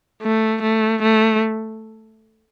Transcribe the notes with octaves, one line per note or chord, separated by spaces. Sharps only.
A3
A3
A3